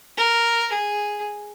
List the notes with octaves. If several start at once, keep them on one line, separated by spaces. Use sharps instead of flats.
A#4
G#4